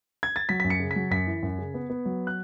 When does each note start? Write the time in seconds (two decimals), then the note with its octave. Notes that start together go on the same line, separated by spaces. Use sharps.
0.23 G#6
0.36 A6
0.49 F#3 B6
0.60 F#2 B6
0.70 C#7
0.80 C#3
0.91 F#3 B6
1.11 F#2 B6
1.27 E3
1.43 F#2
1.58 C#3
1.74 B3
1.90 B3
2.05 F#3
2.27 F#6